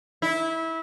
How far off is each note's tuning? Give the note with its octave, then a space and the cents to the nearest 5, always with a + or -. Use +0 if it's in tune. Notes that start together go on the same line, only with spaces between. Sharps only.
E4 -20